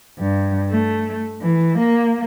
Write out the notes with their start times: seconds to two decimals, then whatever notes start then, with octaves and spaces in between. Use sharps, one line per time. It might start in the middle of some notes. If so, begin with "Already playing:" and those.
0.18 G2
0.68 A3
1.41 E3
1.79 A#3